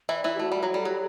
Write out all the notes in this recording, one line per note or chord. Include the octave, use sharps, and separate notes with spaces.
E3 E4
D5
E3 E4
G4
A3 F#4
G3
F#3 F#4
G3 A4
F#3 G4